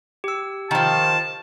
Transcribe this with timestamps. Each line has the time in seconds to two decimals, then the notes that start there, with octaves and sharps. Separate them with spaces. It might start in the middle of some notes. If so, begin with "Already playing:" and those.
0.24 G4 E6
0.71 D#3 F3 A5